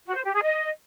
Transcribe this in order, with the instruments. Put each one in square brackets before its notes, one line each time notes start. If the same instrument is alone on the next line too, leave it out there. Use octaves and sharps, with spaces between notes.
[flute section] F#4
C5
G4
G#4
D#5